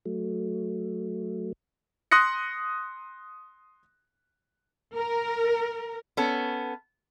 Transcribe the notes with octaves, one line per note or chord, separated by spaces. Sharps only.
F#3 A3
C6 D#6 F#6 A#6 C#7
A#4
B3 C#4 A4